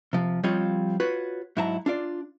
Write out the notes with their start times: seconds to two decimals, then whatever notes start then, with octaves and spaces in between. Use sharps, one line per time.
0.13 C3 F3
0.43 F3 G3 C4 F4 C#5 D#5
1.00 F4 F#4 B4 C#5
1.57 G#2 F#3 E4 A5 A#5
1.86 D4 F4 D5